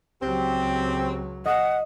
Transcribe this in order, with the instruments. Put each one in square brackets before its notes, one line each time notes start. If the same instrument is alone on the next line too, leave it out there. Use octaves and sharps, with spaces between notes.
[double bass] C#2 F#3 [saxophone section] C4 G4
[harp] D#5 [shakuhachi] F#5